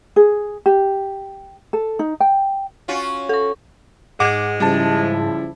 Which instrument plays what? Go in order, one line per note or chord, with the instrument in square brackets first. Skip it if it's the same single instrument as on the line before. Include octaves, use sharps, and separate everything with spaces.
[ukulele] G#4
G4
A4
D#4
G5
[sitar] C#4 F4 F#4
[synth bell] A4 C#6
[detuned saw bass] G#2 [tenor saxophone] G#3 [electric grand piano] F#5 D6
[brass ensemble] C#3 F3 E4 [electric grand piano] G3 A5